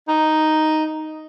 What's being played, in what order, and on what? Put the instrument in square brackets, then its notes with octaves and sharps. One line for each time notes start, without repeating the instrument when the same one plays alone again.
[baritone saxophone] D#4